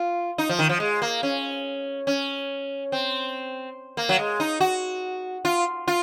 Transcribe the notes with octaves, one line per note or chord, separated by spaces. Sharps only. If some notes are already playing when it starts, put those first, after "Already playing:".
Already playing: F4
D#4
F3
D#3
F3
G#3
A#3
C#4
C#4
C4
A#3
F#3
G#3
D#4
F#4
F4
F4